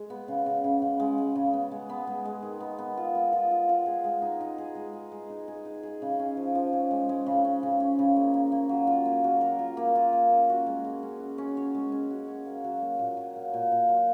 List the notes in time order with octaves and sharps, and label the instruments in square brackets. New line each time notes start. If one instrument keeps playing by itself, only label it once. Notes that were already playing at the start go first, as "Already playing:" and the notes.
Already playing: [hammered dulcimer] G#3
B3
C#3
C#3
C#3
C#3
G#3
G#3
C#3
B3
G#3
B3
G#3
G#3
D#3
B3
B3
F4
B3
F4
F4
F4
G#4
G#3
D#4
D#4
G#4
G#3
G#4
G#3
D#4
G#4
D#4
G#4
C#3
C#4
F3
F3
C#4
G#3
G#3
C#3
C#4
C#3
C#4
C#3
A#3
A#3
A#3
F#3
F4
A#3
F#3
A#4
F4
A#3
F4
A#3
C#4
F#4
G#3
G#3
C#4
F#4
C#4
C#5
G#3
C#4
F#4
C#5
A#3
F#3
A#3
A#2
F#3
A#3
A#2
A#2
F#3